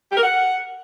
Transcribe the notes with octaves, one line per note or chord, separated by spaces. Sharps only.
G4
A#4
F#5